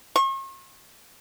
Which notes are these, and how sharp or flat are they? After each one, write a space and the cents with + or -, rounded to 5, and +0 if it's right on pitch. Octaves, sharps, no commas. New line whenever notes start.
C#6 -45